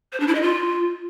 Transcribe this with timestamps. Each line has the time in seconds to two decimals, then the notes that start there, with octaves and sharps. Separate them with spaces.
0.13 C5
0.20 D4
0.27 E4
0.35 D#5
0.42 F4